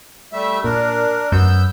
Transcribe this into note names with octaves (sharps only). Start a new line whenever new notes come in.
G3 A3 E5
A#2 D4 A#4
F#2 F#3 B3 E6 G6